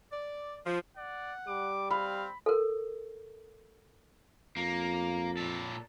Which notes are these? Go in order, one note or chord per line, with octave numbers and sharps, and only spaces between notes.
D5
F3
D5 F#5
G3 D6
C4 F5 B5
A4 A#4
F2 A#3
A#2 A4